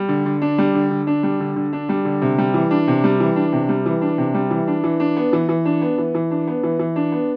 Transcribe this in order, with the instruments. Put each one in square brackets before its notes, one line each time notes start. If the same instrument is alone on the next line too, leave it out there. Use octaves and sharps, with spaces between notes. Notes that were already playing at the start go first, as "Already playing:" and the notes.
Already playing: [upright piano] G3
D3
D3
D4
G3
D3
D3
D4
G3
D3
D3
D4
G3
D3
C3
G3
E3
D4
C3
G3
E3
D4
C3
G3
E3
D4
C3
G3
E3
D4
E3
D4
B3
E3
E3
D4
B3
E3
E3
D4
B3
E3
E3
D4
B3